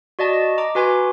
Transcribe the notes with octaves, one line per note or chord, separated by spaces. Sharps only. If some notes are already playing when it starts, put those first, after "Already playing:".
F#4 D5 D#5 A5
D#5
A#5 D6
F#4 B4 G#5 C6 D6